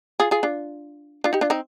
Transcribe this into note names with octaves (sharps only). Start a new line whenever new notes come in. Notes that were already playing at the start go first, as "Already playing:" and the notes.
F4 G#4
F4 G#4
D4 F4
D4 F4
D#4 G4
D4 F4
C4 D#4